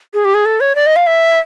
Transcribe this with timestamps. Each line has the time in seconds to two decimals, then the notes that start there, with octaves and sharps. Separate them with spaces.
0.14 G#4
0.25 G4
0.34 G#4
0.45 A4
0.60 C#5
0.75 D5
0.86 D#5
0.96 F5
1.07 E5